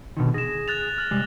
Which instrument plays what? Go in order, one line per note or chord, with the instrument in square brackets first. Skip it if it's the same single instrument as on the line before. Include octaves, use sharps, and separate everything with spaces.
[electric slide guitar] B2 D3 D#3
[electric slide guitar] G#4 [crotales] A#6 E7
[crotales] F#6 A6 F7
F6 F#7
[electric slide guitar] C3 G3 G#3